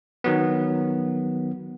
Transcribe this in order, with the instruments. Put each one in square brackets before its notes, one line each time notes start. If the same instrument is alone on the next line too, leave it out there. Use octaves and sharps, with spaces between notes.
[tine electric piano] D#3 F#3 B3